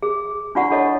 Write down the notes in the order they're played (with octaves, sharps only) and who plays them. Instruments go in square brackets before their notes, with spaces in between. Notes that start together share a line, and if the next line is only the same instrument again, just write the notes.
[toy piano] G#4
D4 E4 F4 D5 F#5 C#6
D4 E4 A4 C#5 D#5